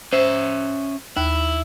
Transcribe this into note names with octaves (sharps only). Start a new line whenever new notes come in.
C#4 C5 E5
D#2 E4